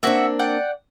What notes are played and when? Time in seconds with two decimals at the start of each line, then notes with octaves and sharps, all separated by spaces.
0.03 A#3 C4 D4 F#4 E5
0.39 D5 F#5 G5